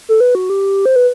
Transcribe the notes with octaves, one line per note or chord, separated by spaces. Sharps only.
A4
B4
F#4
G4
C5
B4